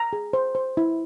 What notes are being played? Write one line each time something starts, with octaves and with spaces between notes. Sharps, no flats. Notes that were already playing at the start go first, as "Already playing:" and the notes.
Already playing: A#5
G#4
C5
C5
E4